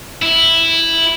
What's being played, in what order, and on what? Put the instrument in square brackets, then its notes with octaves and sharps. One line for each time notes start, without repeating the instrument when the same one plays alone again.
[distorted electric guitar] E4